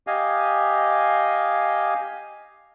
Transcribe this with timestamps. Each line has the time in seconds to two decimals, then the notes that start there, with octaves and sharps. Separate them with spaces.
0.07 G4 D#5 F5 G#5